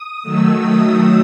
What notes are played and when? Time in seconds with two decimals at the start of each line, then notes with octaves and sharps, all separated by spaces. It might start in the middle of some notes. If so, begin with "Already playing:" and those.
Already playing: D#6
0.22 D#3 F#3 A3 E6
0.59 D#6